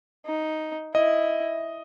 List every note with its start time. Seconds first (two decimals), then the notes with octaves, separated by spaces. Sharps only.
0.26 D#4
0.94 E4 D#5